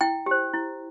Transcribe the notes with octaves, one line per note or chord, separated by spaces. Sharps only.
E4 G5
G4 C5
E4